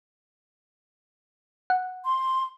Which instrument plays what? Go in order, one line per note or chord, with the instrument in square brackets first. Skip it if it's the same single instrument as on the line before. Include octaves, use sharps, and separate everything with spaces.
[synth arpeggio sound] F#5
[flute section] C6